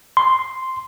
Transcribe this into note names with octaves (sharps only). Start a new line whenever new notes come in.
C6